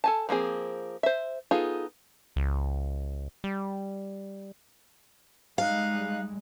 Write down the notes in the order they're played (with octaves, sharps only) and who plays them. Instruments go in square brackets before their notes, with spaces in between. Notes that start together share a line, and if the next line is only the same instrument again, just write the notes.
[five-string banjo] A4 G#5 A5
F3 A#3 C4 G#4
C5 E5
B3 D#4 F4 G#4 A4
[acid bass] C#2
G3
[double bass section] G3 G#3 [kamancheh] D#4 F#6 [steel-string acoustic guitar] F5